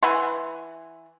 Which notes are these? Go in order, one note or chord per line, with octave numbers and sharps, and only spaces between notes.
E3 B4 F#5 C6